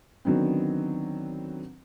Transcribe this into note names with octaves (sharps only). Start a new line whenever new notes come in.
D3 D#3 F#3 B3 C4